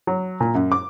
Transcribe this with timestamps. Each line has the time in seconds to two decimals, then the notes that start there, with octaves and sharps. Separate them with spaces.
0.07 F#3
0.40 A#2
0.55 F#2
0.72 D6